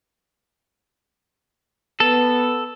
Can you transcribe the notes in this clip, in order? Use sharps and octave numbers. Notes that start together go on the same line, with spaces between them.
B3 A4